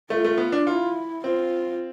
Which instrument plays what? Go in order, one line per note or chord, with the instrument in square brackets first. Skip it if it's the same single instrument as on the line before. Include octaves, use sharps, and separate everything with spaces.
[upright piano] A3 [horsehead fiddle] F4
[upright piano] A3
B3
D4
[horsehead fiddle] E4 [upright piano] F4
[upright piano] C4 [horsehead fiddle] F4